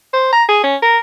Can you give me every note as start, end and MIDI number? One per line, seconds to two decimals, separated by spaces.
0.13 0.30 72
0.33 0.44 82
0.49 0.60 68
0.63 0.76 61
0.82 0.98 70